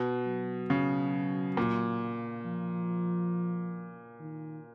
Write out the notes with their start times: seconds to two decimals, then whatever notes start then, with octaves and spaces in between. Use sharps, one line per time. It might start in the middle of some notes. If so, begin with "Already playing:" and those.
Already playing: B2
0.26 F#3
0.70 C#3
1.57 A#2
2.45 F3
4.20 D#3